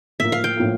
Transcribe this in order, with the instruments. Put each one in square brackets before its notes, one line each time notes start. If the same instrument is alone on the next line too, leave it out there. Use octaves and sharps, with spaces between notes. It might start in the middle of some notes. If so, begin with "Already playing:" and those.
[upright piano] A2 F3 A#3 [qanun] E5
[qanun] F5
G5
[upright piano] A2 F3 A#3